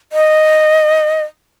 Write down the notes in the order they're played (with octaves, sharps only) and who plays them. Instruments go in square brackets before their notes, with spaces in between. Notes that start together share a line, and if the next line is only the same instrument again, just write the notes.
[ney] D#5